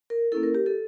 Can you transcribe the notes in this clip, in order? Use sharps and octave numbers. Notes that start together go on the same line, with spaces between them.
A#4
A#3 C#4 E4 A4
A#4
G4
A4